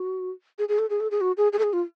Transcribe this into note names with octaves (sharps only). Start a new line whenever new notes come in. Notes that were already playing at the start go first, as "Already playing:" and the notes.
Already playing: F#4
G#4
G#4
A4
G#4
A4
G#4
F#4
G#4
G#4
A4
G#4
F4